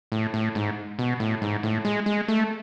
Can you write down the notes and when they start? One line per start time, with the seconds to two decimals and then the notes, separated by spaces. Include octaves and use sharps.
0.12 A2
0.34 A2
0.55 G#2
0.99 B2
1.20 A2
1.42 G#2
1.63 A2
1.85 G#3
2.06 G#3
2.28 A3